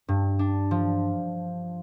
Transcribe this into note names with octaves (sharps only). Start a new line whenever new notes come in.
G2
D4
F3